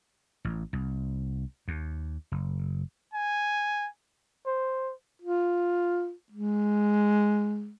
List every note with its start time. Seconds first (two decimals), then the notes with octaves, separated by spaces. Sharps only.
0.45 A1
0.73 C2
1.68 D#2
2.32 F#1
3.13 G#5
4.46 C5
5.22 F4
6.32 G#3